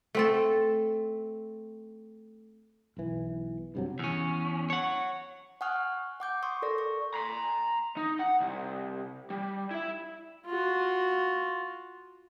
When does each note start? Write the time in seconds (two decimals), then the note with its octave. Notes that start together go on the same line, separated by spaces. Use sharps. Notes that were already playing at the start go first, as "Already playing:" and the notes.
0.15 A3 C4 A4
2.97 B1 E3
3.75 G2 C3 F#3
3.99 E2 C#4
4.70 C#5 F#5
5.61 F#5 G#5 C#6 D#6 F6 F#6
6.20 F#5 D6 G6
6.43 C6 C#6 D#6
6.62 A4 A#4 D5 A#6
6.78 C#6
7.14 A#5 C6
7.97 D#4
8.19 F#5
8.40 C2
9.30 G3
9.71 E4 E5
10.46 F4 F#4